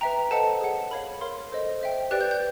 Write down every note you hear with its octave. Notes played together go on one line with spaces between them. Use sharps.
B4 E5 G5 A#5
A4 C5 D#5 F#5 A5
G#4 C#5 F#5
A#4 C#5 F5 B5
A#4 C#5 F5 C6
A4 C5 D#5
C5 E5 G5
G4 B4 D5 G5 F#6
G6
G6